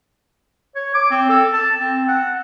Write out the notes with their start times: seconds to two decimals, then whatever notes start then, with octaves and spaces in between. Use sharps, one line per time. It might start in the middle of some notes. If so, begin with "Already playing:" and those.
0.75 C#5
0.94 D6
1.11 C4
1.29 A4
1.52 A5
1.79 C4
2.08 F#5